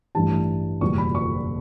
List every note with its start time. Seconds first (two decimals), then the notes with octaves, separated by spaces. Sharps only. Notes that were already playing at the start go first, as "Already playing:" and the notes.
0.15 A1 G2 E3 G3 A5
0.81 F#1 E2 B2 G3 C#6
0.98 B5
1.15 C#6